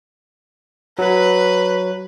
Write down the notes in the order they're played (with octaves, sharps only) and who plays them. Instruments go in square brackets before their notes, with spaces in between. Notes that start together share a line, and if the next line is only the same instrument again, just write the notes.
[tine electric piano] F#3 [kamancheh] B4